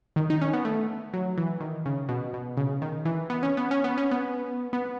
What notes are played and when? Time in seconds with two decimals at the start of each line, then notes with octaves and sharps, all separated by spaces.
0.16 D#3
0.30 D#4
0.41 C#4
0.53 B3
0.65 A3
1.14 F#3
1.38 E3
1.60 D#3
1.86 C#3
2.09 B2
2.34 B2
2.57 C#3
2.82 D#3
3.05 E3
3.30 B3
3.43 C#4
3.57 B3
3.71 C#4
3.84 B3
3.98 C#4
4.11 B3
4.73 B3